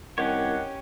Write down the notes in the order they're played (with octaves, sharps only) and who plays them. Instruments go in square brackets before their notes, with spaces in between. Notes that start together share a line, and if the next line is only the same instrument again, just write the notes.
[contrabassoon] C2 [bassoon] D#3 [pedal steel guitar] C#4 G4 C#5 [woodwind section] F#5